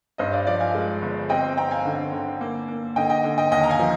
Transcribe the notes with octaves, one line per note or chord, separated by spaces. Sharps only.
G2 C5 D#5
D5 F5
F3 D5 F5
F5 G#5
G#3
G1
C4 D#5 G5
C4 G5 A#5
F5 G#5
D3
D3
A#3
A#3
D3 D#5 G5
D#5 G5
D3
D#5 G5
D#2 D#5 G5
A#5
F5 G#5
F3